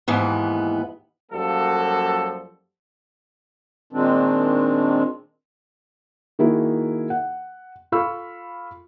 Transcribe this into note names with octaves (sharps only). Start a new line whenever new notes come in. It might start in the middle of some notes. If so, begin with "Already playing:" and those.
D#2 G#2 E3 B3
F#2 F3 G3 A#3 F#4 A4
A#2 D#3 G#3 C4 D4
D#3 A#3 E4 F#4 G#4
F#5
F4 A4 F5 B5 C#6 E6